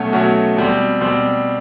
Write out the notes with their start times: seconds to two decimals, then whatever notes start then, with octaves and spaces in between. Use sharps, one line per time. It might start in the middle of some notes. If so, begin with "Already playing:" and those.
Already playing: B2 F#3 A3 C#4 F#4
0.12 B2 F#3 A3 C#4 F#4
0.57 B2 G3 C4
1.01 B2 G3 C4